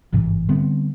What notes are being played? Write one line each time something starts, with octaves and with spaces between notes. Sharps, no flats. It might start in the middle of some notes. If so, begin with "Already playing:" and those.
G#1 G2 C3 E3
D3 G3 B3 C4